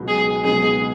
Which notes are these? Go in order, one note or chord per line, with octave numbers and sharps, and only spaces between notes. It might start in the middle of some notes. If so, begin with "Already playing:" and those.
Already playing: C#2 B2 F#3 B3 D#4
G#4
C#2 B2 F#3 B3 D#4 G#4